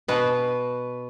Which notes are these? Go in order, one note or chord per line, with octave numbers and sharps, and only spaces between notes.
B2 B4